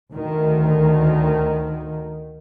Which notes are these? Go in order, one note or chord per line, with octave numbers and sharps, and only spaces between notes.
D2 D#3